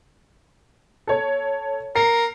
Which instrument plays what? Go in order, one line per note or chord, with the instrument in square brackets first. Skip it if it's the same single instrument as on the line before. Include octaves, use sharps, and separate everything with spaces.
[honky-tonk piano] A4 C#5
[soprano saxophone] A#4 [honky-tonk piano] C7